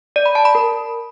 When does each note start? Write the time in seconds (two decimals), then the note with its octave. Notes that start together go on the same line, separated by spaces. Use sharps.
0.16 D5
0.26 B5
0.35 A5
0.45 B5
0.55 A#4